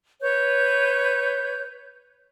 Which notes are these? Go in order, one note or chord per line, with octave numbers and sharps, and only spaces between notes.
B4 C#5 G6